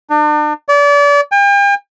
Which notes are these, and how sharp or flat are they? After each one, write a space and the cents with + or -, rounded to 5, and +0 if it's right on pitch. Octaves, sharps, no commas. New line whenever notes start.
D4 +40
D5 -35
G5 +45